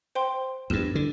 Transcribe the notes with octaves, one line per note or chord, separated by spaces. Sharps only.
C5 G5 C6
E2 G2 E7
D3